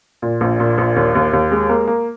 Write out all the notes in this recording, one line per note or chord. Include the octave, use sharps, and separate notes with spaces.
A#2
A#1
A#2
A#1
D#2
D#2
D#2
G#3
A#3
A#3